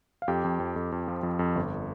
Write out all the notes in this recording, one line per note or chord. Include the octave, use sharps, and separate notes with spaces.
F5
F2 G4 G5
F2
F2
F2
F2
F3
F2
F2
G1